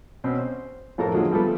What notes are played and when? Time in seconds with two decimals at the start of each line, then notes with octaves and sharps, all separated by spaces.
0.24 B2 C4 C#4
0.39 C5
0.98 F2 A2 A4 A#4 A#5
1.14 D3 F3 F#3 G#3 A#3
1.31 F3 G3 A3 B3 A4